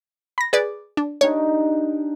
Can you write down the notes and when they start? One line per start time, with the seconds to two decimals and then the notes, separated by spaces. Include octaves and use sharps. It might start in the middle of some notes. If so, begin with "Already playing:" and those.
0.38 B5 A#6
0.53 G#4 B4 D5
0.97 D4
1.21 D4 D#4 G4 C#5